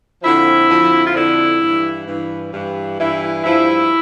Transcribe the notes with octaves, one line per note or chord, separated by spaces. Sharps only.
F2 D3 F3 E4
F2 D3 F3
F4
F2 D3 F3 E4
G2 E3
G2 E3
G2 E3
G2 E3 E4
E4
G2 F3 E4